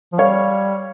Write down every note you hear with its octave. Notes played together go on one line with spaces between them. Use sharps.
F3
G3 C#5 F5